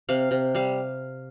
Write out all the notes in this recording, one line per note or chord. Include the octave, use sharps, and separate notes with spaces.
C3 F5
C3
G3 F5